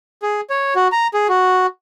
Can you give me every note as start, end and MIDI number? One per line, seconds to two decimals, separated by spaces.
0.22 0.41 68
0.50 0.74 73
0.76 0.88 66
0.92 1.08 82
1.14 1.27 68
1.29 1.67 66